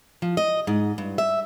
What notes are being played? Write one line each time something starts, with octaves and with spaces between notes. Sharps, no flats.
F3
D#5
G#2
G2
E5